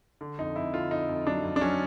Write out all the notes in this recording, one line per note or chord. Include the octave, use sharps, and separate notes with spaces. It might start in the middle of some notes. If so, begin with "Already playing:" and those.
D3
F2 D#4
F2 E4
D3 F4
F2 D#4
F2
F#3 D4
F2
D4
F#3 C#4